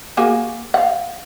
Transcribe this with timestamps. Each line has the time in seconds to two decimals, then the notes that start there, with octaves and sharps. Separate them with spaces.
0.17 A#3 F#4 G#4
0.74 F5 F#5